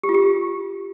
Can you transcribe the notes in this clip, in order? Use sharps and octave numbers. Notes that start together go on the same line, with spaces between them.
G4
F4
G4